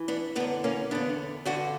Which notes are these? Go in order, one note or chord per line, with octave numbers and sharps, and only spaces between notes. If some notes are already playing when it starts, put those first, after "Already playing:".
Already playing: E3
B3 D4
F#2 D3 B3 D4
A#3 C#4
E2 D3 B3 D4
G2 D3 D4 F#4